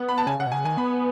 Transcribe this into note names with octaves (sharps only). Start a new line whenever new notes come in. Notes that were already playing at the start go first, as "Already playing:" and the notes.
Already playing: B3 F#5
B5
A5
C#3 G#5
C#3 F#5
B2
C#3 G#5
D#3 G#5
B3 B5